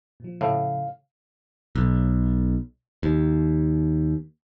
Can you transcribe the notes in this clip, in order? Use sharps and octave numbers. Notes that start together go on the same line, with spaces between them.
A#2 F3
A2 C#3 F5
B1
D#2